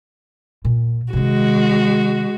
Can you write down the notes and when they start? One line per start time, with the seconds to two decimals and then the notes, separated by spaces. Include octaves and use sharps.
0.65 A#2
1.13 C3 D#3 G#3 F#4